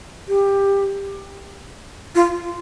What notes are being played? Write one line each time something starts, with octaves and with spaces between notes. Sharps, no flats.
G4
F4